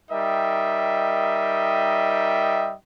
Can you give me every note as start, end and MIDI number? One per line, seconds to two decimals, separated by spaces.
0.11 2.74 55
0.11 2.74 63
0.11 2.74 70
0.11 2.74 75
0.11 2.74 76
0.11 2.74 79